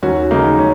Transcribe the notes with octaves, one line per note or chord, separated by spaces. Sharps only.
D#2 C#4 F#4
C#3 G#3 A#3 D#4
C#4